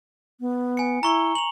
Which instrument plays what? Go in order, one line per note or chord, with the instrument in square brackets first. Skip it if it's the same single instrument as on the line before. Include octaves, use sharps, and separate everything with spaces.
[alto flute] B3
[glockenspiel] G#5 C#7
[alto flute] E4 [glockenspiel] A#5 C#6 G7
[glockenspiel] F7 F#7